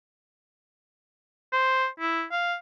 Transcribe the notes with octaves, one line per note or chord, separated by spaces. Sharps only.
C5
E4
F5